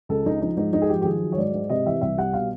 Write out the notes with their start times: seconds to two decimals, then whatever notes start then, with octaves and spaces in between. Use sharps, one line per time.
0.09 C#2 A4
0.26 C#2 D#4
0.41 F3 D#4
0.57 G#2 D#4
0.73 G#2 D#4
0.82 G#4
0.89 F3 G4
1.02 G4
1.05 D#3 G#4
1.22 F#3
1.32 C#5
1.38 G#2 D5
1.54 G#2
1.69 C3 D#5
1.86 E3 E5
2.01 C2 E5
2.18 G3 F#5
2.33 B2 F5